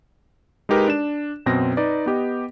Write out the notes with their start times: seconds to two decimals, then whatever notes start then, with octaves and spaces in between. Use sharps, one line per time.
0.69 G#3 D#4 G4 A#4 B4
0.88 D4 E7
1.46 F#2 B2 C4 A#6
1.77 D#4 B4 D5
2.06 B3 G4 D#5